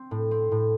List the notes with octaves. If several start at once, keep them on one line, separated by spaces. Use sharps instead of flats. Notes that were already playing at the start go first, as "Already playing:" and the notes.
Already playing: C4
A2
C4
A2